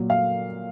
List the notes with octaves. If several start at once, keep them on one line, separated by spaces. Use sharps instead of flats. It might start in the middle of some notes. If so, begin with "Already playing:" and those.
Already playing: A#2 F#3
F5